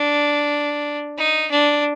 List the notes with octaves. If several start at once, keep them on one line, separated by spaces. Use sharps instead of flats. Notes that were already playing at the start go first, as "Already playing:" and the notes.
Already playing: D4
D#4
D4